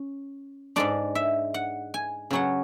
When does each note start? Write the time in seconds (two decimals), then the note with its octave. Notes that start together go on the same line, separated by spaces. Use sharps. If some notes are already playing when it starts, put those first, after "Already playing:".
Already playing: C#4
0.76 G#2 G#3 D4 D5
1.15 E5
1.54 F#5
1.94 G#5
2.31 C#3 F#3 C#4 F#5